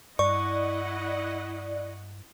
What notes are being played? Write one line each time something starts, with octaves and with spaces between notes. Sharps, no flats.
G2 E4 D5 D#5 F#5 C#6